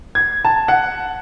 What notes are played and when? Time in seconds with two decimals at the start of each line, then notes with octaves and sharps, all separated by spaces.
0.15 G#6
0.45 A5
0.68 F#5